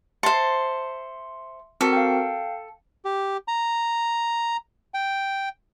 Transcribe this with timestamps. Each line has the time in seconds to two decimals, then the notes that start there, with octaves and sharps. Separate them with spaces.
0.23 C5 E5 A5 C6 C#7
1.81 C4 F#4 A4 A#4
1.93 F5 G5
3.05 G4
3.48 A#5
4.94 G5